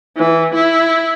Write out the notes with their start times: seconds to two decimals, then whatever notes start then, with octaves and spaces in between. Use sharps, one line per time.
0.17 E3
0.55 E4